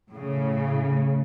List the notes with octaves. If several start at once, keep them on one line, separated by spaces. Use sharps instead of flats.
A2 C#3